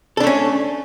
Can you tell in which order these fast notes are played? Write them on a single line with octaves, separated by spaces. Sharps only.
A4 D4 A3 C#4